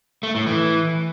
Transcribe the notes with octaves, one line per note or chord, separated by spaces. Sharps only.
A3
A2
E3